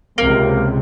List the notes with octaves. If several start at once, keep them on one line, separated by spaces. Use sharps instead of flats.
C#2 C3 A#3